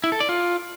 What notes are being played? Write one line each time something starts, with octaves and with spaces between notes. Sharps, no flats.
E4
A4
D5
F4